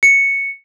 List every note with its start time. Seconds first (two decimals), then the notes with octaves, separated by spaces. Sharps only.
0.03 C#7